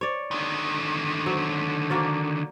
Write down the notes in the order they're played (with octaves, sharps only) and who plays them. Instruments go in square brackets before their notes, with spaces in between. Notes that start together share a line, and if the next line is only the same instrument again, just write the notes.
[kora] C#5 D5
[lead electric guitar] D3 D#3
[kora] F#3
A#3 F#4 D5